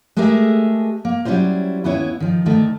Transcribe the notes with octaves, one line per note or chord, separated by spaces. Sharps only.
G#3 A3 G4 G#4 A#4 E5
A#3
F#3 G3 C#4 E4 F4 C5
D#2 B3 C#4 E4 C#5
D#3 F3
D2 D#3 A3